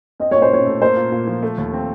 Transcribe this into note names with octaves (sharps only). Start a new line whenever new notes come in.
C4 D#5
A#2 C#5
C5
D#4 C#5
A3
A#3 C5
A#2
A#2
F3
A3 A4
D#2
C4